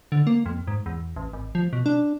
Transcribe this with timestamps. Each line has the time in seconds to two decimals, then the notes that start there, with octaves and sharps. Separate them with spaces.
0.12 D3
0.27 A#3
0.46 F2
0.67 G#2
0.86 E2
1.16 A1
1.33 G#1
1.55 F3
1.73 B2
1.86 D4